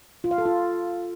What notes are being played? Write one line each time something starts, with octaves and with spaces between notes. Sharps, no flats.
F4
F5
A4
F4